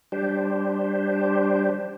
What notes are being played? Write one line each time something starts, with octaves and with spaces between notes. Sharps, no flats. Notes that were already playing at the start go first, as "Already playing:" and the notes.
G3 D4 G4 C5